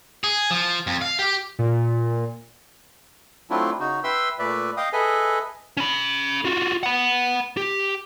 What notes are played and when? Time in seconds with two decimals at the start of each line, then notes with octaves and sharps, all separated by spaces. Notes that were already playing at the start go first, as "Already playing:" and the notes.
0.24 G#4
0.51 F3
0.87 F2
1.02 F5
1.19 G4
1.59 A#2
3.50 F#3 A3 C4 D4 E4 F4
3.80 C#3 D#4 F#4
4.04 B4 E5 G5 C6 E6
4.39 A#2 A3 B4 D5 E5
4.77 D#5 F5 G5 D#6
4.93 G#4 A4 B4 D#5 E5 G#5
5.77 C#4 B5
6.45 F4 F#4
6.83 F#5 B5
7.57 G4